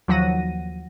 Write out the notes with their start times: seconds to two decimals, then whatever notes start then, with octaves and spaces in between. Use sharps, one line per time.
0.08 D#2 F3 F#3 F#5 A#6 D#7